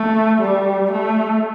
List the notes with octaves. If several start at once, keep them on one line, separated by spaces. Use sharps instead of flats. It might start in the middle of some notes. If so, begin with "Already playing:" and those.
Already playing: A3
G3
A3